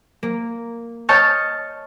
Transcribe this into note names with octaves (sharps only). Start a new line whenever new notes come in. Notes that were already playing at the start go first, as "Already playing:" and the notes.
A#3
C#5 D#5 A5 C#6 F6 G6